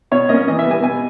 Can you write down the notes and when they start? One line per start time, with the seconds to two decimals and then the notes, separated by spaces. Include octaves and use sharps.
0.11 B2 C#5
0.29 A#3 C#4 D#5
0.48 E3 D#5
0.59 E5
0.65 G3 B3
0.71 G#5
0.82 B2 G#5